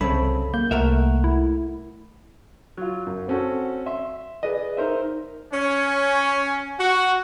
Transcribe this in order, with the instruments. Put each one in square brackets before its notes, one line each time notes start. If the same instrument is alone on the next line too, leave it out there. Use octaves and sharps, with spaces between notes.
[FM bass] C2 [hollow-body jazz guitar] F#2 C#3 C4 [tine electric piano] A4 B5
[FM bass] A#3 [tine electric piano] G6
[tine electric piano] C2 F#5 [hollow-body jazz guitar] A3 A#4 E5
[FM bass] E4
[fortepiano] F#3 F4
F#2
C4 C#4 F#4 A4
E5 C6
G#4 B4 D5 D#5
D#4 A#4 C5 E5
[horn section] C#4
F#4